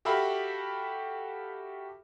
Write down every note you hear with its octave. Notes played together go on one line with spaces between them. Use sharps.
F#4 G4 A4 E5 F5 B5